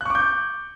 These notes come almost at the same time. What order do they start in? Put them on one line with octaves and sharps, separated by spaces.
F#6 C#6 D6 G6